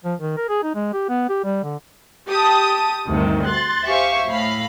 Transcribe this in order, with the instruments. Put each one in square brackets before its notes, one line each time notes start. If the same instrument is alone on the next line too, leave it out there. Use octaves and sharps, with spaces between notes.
[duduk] F3
D#3
A#4
G#4
D#4
G#3
G4
B3
G4
G3
D3
[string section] G4 A5 D#6
D2 G2 C3 D#3
C6 F#6 A6
G4 C5 E5 F5 G#5 C#6
A2 F5 B5